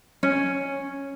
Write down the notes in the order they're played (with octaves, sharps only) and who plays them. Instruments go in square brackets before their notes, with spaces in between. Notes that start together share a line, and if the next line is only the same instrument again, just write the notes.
[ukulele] C#4